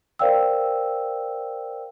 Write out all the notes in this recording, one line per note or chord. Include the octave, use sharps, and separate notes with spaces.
A#4 C5 D5 F5 G5 E6